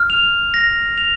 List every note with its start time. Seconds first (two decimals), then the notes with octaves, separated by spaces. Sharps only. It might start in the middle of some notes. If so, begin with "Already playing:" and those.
Already playing: F6
0.10 F7
0.54 A#6
0.98 F7